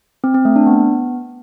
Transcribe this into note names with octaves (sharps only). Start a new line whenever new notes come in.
C4
C4
A3
D4
B3